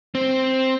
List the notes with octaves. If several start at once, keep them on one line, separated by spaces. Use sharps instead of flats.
C4